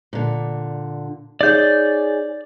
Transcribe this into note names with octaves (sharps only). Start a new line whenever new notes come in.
A#2 D3
D#4 G#4 C#5 D5 G6